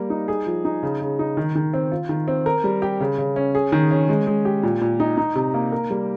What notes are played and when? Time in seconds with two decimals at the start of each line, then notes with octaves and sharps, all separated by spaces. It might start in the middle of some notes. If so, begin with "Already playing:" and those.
Already playing: G3 A#3 A#4
0.10 D#4
0.28 G#4
0.47 F3
0.65 D#4
0.83 C#3
1.01 C#3
1.19 D#4
1.37 D#3
1.55 D#3
1.73 C4
1.92 F4
2.09 D#3
2.28 C4
2.46 A#4
2.64 G3
2.82 G4
3.00 C#3
3.18 C#3
3.36 C#4
3.55 G#4
3.72 D#3
3.91 C#4
4.09 G#3
4.27 G#3
4.45 G4
4.63 A#2
4.81 A#2
5.00 D#4
5.17 D#4
5.35 C3
5.54 A#3
5.72 A#4
5.90 G3